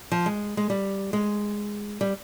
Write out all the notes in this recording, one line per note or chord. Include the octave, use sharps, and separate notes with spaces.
F3
G#3
G#3
G3
G#3
G3